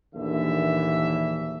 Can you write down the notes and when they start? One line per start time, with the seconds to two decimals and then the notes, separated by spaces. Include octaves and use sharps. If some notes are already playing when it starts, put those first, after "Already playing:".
0.15 A#1 D#2 D3 E3 E5